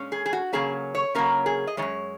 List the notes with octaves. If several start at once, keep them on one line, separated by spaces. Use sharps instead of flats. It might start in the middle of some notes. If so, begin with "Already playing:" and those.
Already playing: A#2 G#3 C#4
G#4
G#4
F#4
C#3 F#3 A#3 C#4 G#4
C#5
C#3 F#3 A#3 C#4 A#4
G#4
D#5
F#2 D#3 G#3 C#5